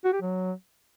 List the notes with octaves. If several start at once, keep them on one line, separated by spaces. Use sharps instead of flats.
F#4
G4
F#3